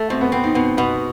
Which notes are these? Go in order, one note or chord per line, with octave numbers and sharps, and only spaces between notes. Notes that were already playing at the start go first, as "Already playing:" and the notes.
Already playing: A3
B2 C4
B3
B3 C4
D#4
B2 B3
B2 B3